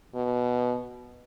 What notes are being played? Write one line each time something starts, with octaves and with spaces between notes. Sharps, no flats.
B2